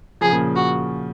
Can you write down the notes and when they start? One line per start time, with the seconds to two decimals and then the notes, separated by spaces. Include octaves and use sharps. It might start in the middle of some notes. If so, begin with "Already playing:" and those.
0.21 C#3 F3 G#4
0.32 A#2 C#3
0.56 F#4